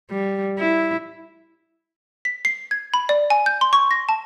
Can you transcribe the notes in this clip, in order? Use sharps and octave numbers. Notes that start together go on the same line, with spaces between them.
G3
E4
B6
C7
G#6
B5
D5
G#5
G6
C6
C#6
A#6
A5